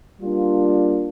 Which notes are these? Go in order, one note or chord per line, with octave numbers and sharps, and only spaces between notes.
G3 A#3 D4 F4